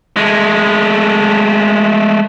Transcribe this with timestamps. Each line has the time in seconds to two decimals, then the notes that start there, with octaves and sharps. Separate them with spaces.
0.17 G#3 A3